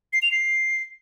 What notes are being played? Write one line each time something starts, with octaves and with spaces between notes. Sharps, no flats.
C7
F7
C7